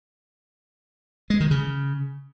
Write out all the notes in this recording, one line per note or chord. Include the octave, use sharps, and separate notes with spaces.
G#3
D#3
C#3